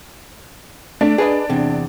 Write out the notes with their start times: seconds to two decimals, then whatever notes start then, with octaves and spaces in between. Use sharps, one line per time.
1.01 A3 D4
1.18 G#4 B4 D#5
1.50 E2 C3